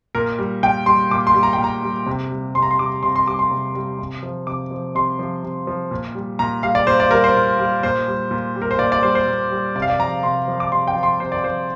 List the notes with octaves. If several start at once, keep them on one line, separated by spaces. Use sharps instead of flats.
A#2 A#4
G3
A#2 G5
G3 C6
A#2 D6
C6
G3
A#5
G5
A#2
A#5
G3
C3
G3
C3 C6
A#5
C6
G3 D6
C3 C6
C6
G3 D6
C6
C3
G3
C3
F3
C3 D6
F3
C3 C6
F3
C3
F3
A#2
G3
A#2 A#5
G3 F5
D5
A#2 C5
D5
G3 A#4
C5
A#2
G3
A#2 C5
G3
A#2
G3
A#4
C5
A#2 D5
D5
G3 C5
C5
A#2
G3
C3 D5
F5
D5
F3 A#5
C3 C6
F3
D6
C3 C6
G5
F3
C6
C3 C5
D5
F3 C5